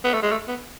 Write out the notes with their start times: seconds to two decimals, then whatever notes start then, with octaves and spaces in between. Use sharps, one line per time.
0.04 B3
0.14 A3
0.22 G#3
0.32 A3
0.48 B3